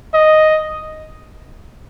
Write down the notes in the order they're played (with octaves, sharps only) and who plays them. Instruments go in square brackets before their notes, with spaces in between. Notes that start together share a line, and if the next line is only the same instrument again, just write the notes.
[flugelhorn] D#5